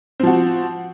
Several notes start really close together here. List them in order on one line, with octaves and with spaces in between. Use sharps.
C4 F3 F#4